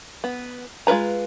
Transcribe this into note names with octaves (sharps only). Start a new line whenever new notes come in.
B3
G#3 F4 A#4 B4 A#5